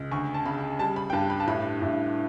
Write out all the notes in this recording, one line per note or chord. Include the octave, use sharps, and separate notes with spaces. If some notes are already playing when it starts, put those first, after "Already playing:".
Already playing: C#2
D2 C#6
A5
C#3 B5
G3 A5
B5
G5
G2 A5
B5
A5
A2 B5
A2